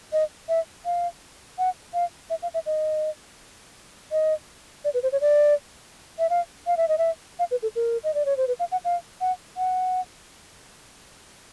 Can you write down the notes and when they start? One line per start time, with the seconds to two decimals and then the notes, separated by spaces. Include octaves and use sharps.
0.13 D#5
0.49 E5
0.85 F5
1.58 F#5
1.94 F5
2.30 E5
2.42 F5
2.54 E5
2.66 D#5
4.12 D#5
4.85 D5
4.94 B4
5.03 C5
5.12 C#5
5.21 D5
6.19 E5
6.30 F5
6.67 F5
6.77 E5
6.88 D#5
6.98 E5
7.39 F5
7.51 B4
7.62 A4
7.76 A#4
8.04 D#5
8.14 D5
8.25 C#5
8.37 C5
8.48 B4
8.59 F5
8.72 F#5
8.85 F5
9.21 F#5
9.57 F#5